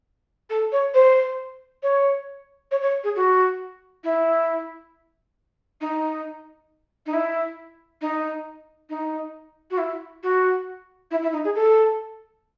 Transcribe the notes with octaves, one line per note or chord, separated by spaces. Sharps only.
A4
C#5
C5
C#5
C#5
C#5
G#4
F#4
E4
D#4
D#4
E4
D#4
D#4
F#4
E4
F#4
E4
E4
D#4
G#4
A4